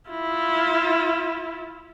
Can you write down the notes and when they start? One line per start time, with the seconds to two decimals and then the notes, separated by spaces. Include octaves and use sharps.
0.10 E4 F4